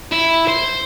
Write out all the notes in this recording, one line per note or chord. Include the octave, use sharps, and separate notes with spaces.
E4
C5